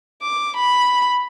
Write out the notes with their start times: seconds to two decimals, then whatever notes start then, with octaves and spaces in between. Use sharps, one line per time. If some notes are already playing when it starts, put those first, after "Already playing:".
0.22 D6
0.57 B5